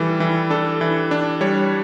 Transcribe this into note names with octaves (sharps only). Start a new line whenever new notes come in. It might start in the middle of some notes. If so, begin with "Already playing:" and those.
Already playing: E3 G3 A4
E3
D4 A4
E3
D4
G3 C#5